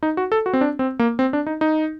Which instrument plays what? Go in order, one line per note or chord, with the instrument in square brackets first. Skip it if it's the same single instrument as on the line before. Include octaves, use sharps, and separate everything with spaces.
[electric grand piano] D#4
F#4
A4
F#4
C4
D4
C4
A#3
C4
D4
D#4
D#4